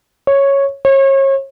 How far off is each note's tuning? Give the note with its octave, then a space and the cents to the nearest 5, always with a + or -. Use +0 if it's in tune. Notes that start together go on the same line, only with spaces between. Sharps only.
C#5 -5
C#5 -35